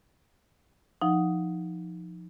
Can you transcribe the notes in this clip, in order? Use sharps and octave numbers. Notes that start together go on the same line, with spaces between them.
F3 D#4 F#5